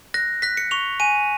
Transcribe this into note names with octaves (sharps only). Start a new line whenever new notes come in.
F#6 A#6
F#6 B6
C#7
C#6 F7
G#5 D#7